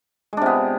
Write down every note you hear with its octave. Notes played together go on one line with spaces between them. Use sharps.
C3 G#3 B3 D4